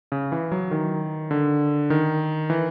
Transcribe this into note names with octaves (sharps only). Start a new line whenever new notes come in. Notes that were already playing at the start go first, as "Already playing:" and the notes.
C#3
E3
F#3
D#3
D3
D#3
E3